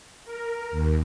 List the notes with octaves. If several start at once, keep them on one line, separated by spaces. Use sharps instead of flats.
A#4
D#2